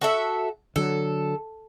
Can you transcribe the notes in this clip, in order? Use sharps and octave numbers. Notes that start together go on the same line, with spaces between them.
F#4 A4 E5
D3 F#3 A4